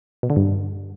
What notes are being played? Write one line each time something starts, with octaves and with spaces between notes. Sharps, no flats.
B2
D3
G2